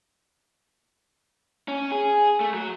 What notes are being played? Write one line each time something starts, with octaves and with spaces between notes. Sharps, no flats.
C#4
G#4
A3
F#3